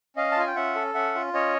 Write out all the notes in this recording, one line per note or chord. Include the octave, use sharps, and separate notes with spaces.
C#4 D#5 F5
A5
F4 G#5
G5
C#4 E5 F#5
A4
C#4 E5 F#5
F4
C#4 C#5 D#5